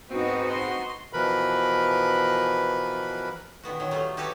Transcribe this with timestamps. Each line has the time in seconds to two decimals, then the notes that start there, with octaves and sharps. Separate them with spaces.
0.10 G#2 B2 B3 C4 D#4 F#4
0.49 C6
1.13 B2 E3 F3 A#4 B4 B5
3.63 A#2 D#3 B3 F#4
3.80 D#3 F#3
3.91 F#3 G3 A3 B3 F4
4.17 F#4 G4 A4 B4 C#5 E5